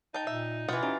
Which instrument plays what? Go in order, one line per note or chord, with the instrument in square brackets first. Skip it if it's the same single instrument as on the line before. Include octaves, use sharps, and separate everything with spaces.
[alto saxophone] D#4 [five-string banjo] G5 A5
[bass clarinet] A#2 [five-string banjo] E5
[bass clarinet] B2 [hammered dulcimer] E3 F4 [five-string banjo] B3 F#5 G5
[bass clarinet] C#4 [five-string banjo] D#4 [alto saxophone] G4